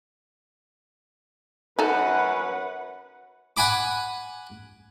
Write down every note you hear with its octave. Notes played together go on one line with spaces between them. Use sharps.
F#2 D#4 A4 B4 F#5
F#5 G#5 B5 D6